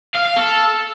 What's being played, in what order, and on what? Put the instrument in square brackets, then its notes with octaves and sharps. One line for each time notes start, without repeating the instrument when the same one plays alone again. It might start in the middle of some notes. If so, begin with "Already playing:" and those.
[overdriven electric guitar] F5
F5
A4